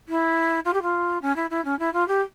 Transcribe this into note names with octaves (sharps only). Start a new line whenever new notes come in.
E4
F4
G4
F4
C#4
E4
E4
C#4
E4
F4
G4